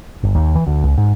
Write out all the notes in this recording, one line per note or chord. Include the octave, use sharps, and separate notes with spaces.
G1
D#2
E3
D2
C#2
G#2